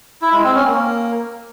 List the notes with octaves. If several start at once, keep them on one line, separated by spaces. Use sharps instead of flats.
E4
G#3
C4
C#4
A#3